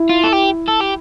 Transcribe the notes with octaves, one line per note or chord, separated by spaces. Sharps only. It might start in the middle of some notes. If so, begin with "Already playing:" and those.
Already playing: E4
F4
A4
G4
A4
G4